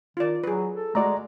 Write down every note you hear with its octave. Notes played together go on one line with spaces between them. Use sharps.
D#3 F4 D5
F#3 G#4 B4
A4
G#3 A3 F#4 D5 A#5